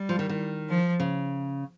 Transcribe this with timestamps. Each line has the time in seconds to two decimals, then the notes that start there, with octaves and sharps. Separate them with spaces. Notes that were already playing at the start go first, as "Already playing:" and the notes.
Already playing: G3
0.09 F3
0.19 D#3
0.29 D#3
0.69 F3
1.00 C#3